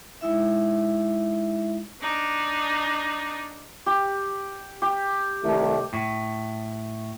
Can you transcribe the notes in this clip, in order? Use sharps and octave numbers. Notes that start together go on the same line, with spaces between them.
G#3 D#4 E4 E5
D4 D#4
G4
G4
C2 D#3 A3
A2